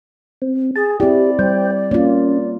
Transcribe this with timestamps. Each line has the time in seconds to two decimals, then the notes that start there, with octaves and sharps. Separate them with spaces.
0.42 C4
0.76 G#4 A5
1.00 C4 E4 G4 D5
1.39 G3 C5 G5
1.91 A#3 C#4 F4